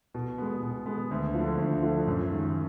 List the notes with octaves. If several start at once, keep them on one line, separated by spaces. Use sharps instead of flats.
B2
G#3 B3
B2
G#3 B3
D2
D3 F3
D2
D3 F3
F#2
D#3 G#3